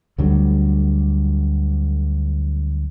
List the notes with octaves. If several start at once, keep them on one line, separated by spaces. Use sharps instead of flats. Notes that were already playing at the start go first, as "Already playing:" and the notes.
D2 D3 F#3 G3